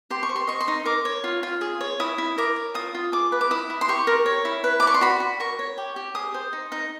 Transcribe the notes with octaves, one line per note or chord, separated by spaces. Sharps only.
G4 C6
C#6
C5
C6
D#5 C#6
C6
D#4
A#4 D6
C#5
F4
F4
G#4
C#5
E4 D#6
E4
A#4 D6
C#5
F4 D#6
F4
G#4 D6
B4
D6
E4 D#6
E4
C6
G4 C#6
A#4
C#5
E4
B4
D6
D5 C#6
C6
F#4 B5
F#4
A#4 C#6
C#5
G4
G4
G#4 D#6
C5
D#4
D#4